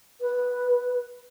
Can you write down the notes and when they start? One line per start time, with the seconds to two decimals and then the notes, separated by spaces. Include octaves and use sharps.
0.21 B4